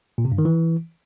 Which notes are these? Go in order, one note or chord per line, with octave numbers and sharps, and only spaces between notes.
A#2
C3
G2
D#3
E3